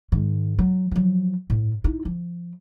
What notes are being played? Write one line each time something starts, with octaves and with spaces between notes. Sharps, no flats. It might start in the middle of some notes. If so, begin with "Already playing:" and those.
G#2 D#3
F#3
F3 F#3
A2
D#4 E4
F3